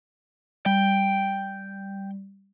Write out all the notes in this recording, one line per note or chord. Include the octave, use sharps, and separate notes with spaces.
G3 G5